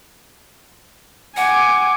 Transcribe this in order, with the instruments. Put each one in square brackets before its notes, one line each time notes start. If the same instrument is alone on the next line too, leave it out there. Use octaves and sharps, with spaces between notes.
[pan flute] F#5 [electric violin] G#5 D6